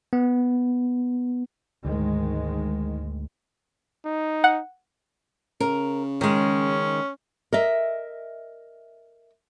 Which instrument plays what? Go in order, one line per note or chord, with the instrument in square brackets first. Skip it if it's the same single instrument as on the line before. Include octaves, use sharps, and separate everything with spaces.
[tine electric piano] B3
[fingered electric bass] D2 [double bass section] G#2 D#3 G#3
[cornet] D#4
[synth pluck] F#5
[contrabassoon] C#3 [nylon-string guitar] A#4
[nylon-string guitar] D#3 G#3 [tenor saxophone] C#4
[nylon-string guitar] A#4 D#5 E5